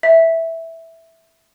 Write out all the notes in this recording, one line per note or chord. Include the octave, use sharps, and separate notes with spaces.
E5